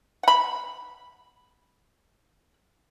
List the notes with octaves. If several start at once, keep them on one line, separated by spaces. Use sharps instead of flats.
F#5 B5